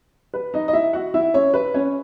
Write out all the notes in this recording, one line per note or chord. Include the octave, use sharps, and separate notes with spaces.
B4
D#4 D#5
D#5
E4 E5
F#4 F#5
E4 E5
C#4 C#5
B4
C#4 C#5